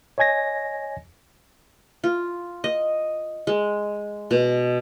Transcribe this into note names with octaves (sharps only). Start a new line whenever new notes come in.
C#5 D#5 G#5 G#6 A#6
F4
D#5
G#3
B2